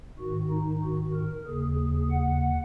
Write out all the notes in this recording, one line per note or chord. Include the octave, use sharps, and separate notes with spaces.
G#2 D#3 F#4
D#4
F#4
A#4
D#2 C#3 G#4
G#4
F#5